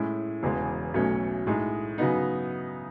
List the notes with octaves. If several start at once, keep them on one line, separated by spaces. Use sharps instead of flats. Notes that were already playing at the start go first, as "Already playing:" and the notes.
Already playing: A2 G#3 C#4 E4
E1 E2 C#3 G#3
B1 B2 A3 C#4
A2 G#3 D#4
C#3 F#3 B3 D#4